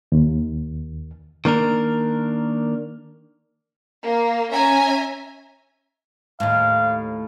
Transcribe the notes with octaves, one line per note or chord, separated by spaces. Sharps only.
D#2
D#3 A#3 D4 A#4
A#3
C#4 E5 G#5 A#5
D#2 A2 F5